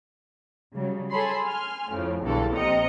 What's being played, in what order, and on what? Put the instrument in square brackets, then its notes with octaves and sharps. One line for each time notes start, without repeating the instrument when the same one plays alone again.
[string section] C#3 F#3 G3
G#4 A4 C#5 B5 C6
G#5 C6 F6
F2 A2 C#3 F3
B1 E2 G2 D3 A4
A#1 C3 D#5 A#5 C#7